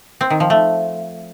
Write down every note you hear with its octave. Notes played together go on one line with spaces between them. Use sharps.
C4
D#3
F3
A3